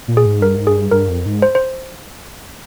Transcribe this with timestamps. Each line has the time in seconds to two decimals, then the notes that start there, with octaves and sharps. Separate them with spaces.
0.08 A#2
0.17 G#4
0.26 G#2
0.41 G2 A#4
0.56 G#2
0.67 G2 G#4
0.91 G2 A#4
1.09 F2
1.26 G#2
1.42 C5
1.55 C5